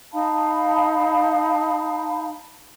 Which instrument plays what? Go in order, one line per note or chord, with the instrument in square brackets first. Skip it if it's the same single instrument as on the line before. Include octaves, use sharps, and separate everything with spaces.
[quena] D#4 [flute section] F5 A5 B5